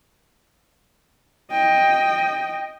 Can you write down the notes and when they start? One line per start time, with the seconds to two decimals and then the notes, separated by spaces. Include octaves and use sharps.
1.52 D#5 G5